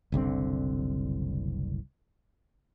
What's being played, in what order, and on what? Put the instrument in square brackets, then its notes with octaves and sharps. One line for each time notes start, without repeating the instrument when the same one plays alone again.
[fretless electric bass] F#1 C2 D3 C4